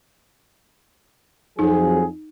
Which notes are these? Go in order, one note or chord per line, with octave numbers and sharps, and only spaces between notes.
F2 F#3 D#4 G#4